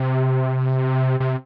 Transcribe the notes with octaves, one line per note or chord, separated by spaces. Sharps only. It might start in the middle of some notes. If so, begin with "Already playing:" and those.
Already playing: C3
C3